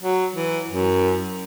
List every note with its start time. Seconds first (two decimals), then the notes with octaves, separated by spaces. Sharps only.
0.02 F#3
0.36 E3
0.70 F#2